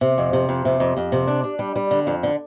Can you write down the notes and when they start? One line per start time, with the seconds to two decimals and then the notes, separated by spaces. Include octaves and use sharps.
0.01 C3
0.18 F2
0.33 C3
0.49 F2
0.65 C3
0.80 F2
0.97 F2
1.12 C3
1.27 D4
1.44 D4
1.59 G3
1.76 G3
1.91 D3
2.07 F2
2.23 D3